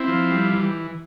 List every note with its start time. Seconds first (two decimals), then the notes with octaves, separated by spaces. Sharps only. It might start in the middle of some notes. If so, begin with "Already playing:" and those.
Already playing: C4 E4
0.08 F3
0.31 G3
0.53 E3